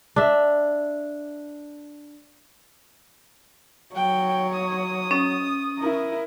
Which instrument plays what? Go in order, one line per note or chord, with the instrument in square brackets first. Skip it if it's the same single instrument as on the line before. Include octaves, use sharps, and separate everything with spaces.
[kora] D4 E5
[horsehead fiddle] F#3 C#5 [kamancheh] G5
[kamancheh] D#6
[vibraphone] C#4
[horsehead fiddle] E4 A#4